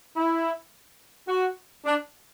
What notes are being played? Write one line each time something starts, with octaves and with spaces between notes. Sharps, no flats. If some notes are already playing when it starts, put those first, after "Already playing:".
E4
F#4
D4